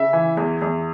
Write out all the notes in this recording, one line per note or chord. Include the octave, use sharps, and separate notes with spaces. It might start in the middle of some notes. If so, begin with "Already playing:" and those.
Already playing: C#3 E5
E3
E2
E2